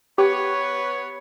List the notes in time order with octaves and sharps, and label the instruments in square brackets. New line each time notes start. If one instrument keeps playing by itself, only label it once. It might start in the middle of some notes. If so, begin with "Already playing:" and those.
[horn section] B3 B4 C#5 [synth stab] G4